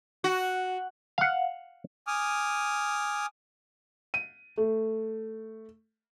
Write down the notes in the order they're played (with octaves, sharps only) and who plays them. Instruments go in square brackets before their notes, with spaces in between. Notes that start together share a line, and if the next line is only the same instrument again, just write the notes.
[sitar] F#4
[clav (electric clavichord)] F5 F#5
[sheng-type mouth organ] G#5 D6 D#6 F6
[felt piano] D#7
A3